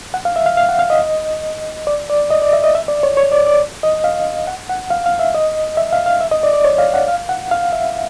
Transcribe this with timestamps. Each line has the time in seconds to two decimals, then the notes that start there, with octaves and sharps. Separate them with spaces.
0.14 F#5
0.25 F5
0.36 E5
0.46 F5
0.57 F5
0.69 F#5
0.79 F5
0.90 D#5
1.87 D5
2.10 D5
2.30 D#5
2.42 D5
2.53 E5
2.64 D#5
2.75 E5
2.88 D5
3.03 C#5
3.17 C#5
3.32 D5
3.46 D5
3.83 D#5
4.04 F5
4.47 F#5
4.69 F#5
4.90 F5
5.06 F5
5.19 E5
5.35 D#5
5.77 E5
5.93 F5
6.06 F5
6.21 E5
6.31 D#5
6.43 D5
6.53 D5
6.64 C#5
6.78 F5
6.94 F#5
7.08 F5
7.29 F#5
7.51 F5
7.72 E5